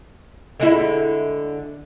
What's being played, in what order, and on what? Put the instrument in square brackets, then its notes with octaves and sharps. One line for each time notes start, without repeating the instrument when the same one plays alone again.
[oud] D3 G#3 E4